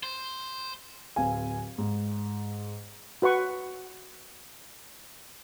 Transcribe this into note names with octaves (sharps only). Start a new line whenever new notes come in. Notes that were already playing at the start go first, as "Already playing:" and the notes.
C5
D1 C4 B4 F5 G#5
G#2
F#4 B4 F#5 C#6